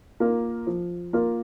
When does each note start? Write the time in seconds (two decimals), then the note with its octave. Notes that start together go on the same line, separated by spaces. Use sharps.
0.20 A#3 F4 A#4
0.67 F3
1.13 A#3 F4 A#4